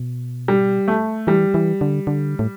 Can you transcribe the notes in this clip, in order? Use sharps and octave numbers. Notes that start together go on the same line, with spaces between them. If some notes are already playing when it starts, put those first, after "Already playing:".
Already playing: B2
G3
A3
E3 G3
E3
D3
D3
A2